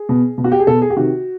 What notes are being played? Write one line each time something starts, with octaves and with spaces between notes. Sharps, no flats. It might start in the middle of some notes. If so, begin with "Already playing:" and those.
Already playing: G#4
B2
B2
F#4
G4
G#4
B2 A4
G#4
G4
C3 D#3 F#4